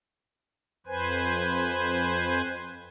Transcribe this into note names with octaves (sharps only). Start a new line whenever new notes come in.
F2 B4 C5 G#5